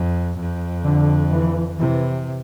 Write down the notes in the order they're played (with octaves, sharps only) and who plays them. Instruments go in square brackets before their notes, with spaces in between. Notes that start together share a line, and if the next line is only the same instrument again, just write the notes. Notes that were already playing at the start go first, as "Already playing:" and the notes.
Already playing: [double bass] F2
F2
[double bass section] D3
E3
[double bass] C3 [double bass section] E3